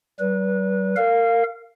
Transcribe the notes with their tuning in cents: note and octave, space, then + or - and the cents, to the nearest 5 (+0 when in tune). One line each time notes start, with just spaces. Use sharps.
G3 -40 B4 -25
A#4 -25 F5 +0